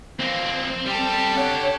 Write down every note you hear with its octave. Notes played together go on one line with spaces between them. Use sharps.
F2 A#3 C4
G3 G4 A4
D4 C#5 F#5